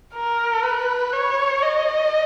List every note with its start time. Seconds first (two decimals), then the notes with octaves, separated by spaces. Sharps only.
0.14 A#4
0.63 B4
1.12 C#5
1.62 D#5